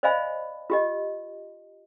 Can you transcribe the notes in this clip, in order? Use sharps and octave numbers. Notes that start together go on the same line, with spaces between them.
C5 D5 D#5 F5 G#5 B5
F4 G4 D#5